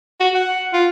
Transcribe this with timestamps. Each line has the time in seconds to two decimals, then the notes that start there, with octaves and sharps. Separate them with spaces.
0.20 F#4
0.35 F#5
0.73 F4